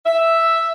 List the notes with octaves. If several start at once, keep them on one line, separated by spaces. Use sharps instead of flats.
E5